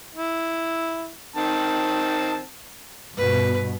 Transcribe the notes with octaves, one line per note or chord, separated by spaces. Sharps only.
E4
D#3 C4 A5
G2 B2 B4